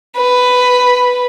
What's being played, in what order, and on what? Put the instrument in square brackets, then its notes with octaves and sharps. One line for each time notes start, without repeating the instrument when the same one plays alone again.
[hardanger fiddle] B4